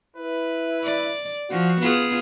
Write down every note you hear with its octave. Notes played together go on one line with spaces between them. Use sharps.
E4 B4
D5
F3 F#4
B3 F4 G#4